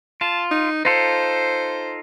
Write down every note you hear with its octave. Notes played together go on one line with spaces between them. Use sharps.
F4 A5
D#4
D#4 F4 A4 C5